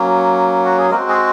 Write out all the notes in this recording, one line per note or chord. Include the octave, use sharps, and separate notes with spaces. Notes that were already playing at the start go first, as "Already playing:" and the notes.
Already playing: F#3 A#3 C#4
F#4
G#4
G#3 A#3 C4 F#4 A#4
G#4